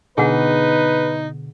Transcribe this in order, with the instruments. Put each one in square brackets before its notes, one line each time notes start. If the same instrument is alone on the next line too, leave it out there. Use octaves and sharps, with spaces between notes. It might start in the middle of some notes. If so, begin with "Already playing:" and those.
[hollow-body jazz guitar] B2 D3 G#5 [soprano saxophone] D#4 [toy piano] G#4 F#5 [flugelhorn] B4